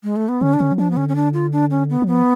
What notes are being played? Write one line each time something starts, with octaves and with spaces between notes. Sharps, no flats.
G#3
A3
B3
D3 C#4
D4
D3 C#4
F#3
F3 D4
B3
D3 C#4
C#4
D4
F4
D4
C#4
B3
F#3
F3 B3